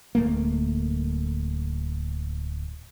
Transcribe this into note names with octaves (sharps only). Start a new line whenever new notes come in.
D1 A3 A#3